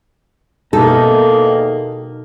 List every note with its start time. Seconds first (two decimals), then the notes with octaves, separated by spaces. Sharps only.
0.73 E2 B2 D#3 A#3 D#4 A4 A#4